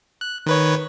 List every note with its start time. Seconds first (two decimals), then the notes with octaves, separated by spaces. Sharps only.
0.21 F#6
0.46 D#3 B4 C#5